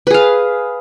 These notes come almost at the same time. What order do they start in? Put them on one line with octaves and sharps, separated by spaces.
B4 G#4 F5